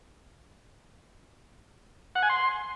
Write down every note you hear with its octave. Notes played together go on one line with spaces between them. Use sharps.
F#5
G#5
C6